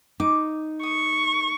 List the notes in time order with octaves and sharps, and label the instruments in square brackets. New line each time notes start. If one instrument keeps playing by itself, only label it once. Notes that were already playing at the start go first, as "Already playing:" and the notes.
[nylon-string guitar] D#4 [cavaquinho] D6
[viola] C#6 [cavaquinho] D#6